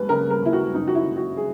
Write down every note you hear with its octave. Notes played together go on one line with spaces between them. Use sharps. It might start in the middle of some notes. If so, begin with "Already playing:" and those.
Already playing: D#2 G#3 B4
C#3 A#4
A#4
D#2 E4
F#4
F#1 D#4
F#4
E4
D#3
F#4
G#4